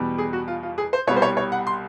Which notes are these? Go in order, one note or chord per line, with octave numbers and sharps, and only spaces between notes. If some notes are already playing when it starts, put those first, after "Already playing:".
Already playing: E2 B2 G3
G#4
F#4
F4
F4
G#4
C5
C2 B2 G3 C#5
C5
C#5
C#5
F#5
C6